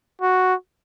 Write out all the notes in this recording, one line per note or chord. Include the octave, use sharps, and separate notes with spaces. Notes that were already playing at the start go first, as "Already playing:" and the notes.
F#4